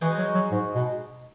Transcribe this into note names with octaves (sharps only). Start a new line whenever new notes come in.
E3 G#3 D#4 F#4
F#3
F#3
G#2
B2